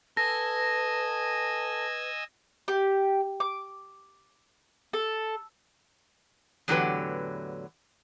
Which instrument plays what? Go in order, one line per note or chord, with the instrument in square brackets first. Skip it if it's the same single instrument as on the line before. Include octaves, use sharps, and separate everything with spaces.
[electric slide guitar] A4 [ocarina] B4 [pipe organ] D#5 G#5 E6 [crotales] A#6
[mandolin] G4
D6
A4
[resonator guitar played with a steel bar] E2 A2 D3 F#3 G4 B4